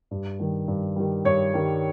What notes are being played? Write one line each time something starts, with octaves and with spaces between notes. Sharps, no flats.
G2
D#3 G3
G2
D#3 G3
G2 C#5
D#3 G3